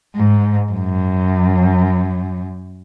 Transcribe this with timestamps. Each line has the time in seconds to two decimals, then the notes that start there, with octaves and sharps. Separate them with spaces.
0.16 G#2
0.72 F#2